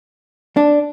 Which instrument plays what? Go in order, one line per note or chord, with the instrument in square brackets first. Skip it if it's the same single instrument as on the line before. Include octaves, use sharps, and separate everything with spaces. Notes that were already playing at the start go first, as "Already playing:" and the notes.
[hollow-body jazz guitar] D4